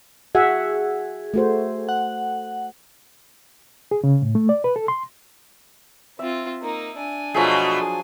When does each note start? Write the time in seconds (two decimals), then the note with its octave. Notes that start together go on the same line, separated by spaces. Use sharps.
0.35 F#4 G#4 E5 F#5
1.34 A3 F#4 C5
1.89 F#5
3.91 G#4
4.04 C#3
4.22 A2
4.35 A3
4.49 D5
4.64 B4
4.76 A4
4.88 C6
6.19 C4 F4 E5
6.62 A#3 D#4
6.98 D4 G#5
7.34 B2 F3 F#3 A3 G#4